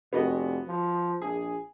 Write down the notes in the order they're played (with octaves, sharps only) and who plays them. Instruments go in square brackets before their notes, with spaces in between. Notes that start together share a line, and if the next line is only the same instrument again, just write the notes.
[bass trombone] F1 [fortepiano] B3 F#4 D#5
[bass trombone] F3
[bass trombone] A#1 [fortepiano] G#4